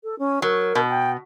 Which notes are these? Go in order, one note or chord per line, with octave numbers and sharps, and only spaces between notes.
A4
C#4
F#3 A#4
B2
G5